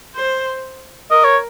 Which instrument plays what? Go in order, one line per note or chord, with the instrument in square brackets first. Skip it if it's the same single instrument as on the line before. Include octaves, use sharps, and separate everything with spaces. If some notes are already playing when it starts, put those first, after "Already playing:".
[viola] C5
[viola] A#4 [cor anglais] D#5
[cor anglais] C#5